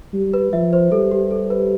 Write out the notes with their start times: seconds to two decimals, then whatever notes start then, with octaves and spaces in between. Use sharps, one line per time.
0.14 G3
0.34 B4
0.53 F3 E5
0.73 C5
0.92 G3 A4
1.11 G4
1.31 A4
1.50 B4